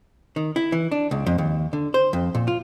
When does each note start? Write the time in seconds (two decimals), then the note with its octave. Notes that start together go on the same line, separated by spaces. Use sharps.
0.36 D#3
0.56 E4
0.72 E3
0.91 D4
1.11 C#2
1.26 F2
1.38 D#2
1.73 D3
1.94 C5
2.13 F2
2.35 A#2
2.48 F4